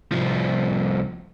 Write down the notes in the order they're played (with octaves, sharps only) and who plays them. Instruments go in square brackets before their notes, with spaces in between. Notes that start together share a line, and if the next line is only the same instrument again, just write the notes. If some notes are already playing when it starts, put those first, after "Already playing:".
[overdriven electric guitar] C2 F3